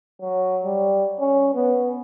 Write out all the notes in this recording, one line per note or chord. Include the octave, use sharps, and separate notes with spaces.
F#3
G3
C#4
B3